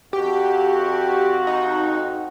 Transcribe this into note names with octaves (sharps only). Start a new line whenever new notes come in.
F2 F#4 G4
D#4